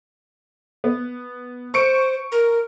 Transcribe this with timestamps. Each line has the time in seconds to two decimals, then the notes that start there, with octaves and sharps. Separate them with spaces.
0.84 B3
1.74 C5 C#6 C#7 D7
2.32 A#4